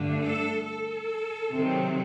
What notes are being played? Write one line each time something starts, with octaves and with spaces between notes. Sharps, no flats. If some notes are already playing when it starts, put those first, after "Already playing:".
Already playing: G2 D3 A3 D4
A4
A4
C3 D#3 F#3 C4